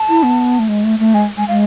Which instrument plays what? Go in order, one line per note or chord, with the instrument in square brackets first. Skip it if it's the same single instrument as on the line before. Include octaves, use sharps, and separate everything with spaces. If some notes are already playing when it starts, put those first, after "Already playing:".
Already playing: [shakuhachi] A5
[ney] E4
B3
A3
G#3
A3
A3
[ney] G#3 [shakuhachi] G#5
[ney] G#3 [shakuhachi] G#5
[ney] G#3 [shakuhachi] F5